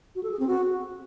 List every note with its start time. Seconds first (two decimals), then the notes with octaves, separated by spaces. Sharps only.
0.15 F#4
0.23 A4
0.31 G#4
0.39 C4
0.47 F#4